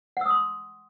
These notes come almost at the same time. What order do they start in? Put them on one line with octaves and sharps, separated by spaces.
F#5 E6 D#6 C6